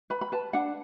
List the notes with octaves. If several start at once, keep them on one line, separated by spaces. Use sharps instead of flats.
B4 B5
B5
B4 A5
D4 F#5